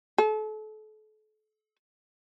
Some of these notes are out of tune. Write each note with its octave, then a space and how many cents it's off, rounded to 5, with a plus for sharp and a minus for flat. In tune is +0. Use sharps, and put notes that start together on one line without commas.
A4 -35